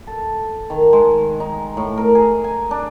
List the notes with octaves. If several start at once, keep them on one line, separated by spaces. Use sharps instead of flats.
A4
D#3
G#3
D#4
A2
A#4
G#4
G#5
D4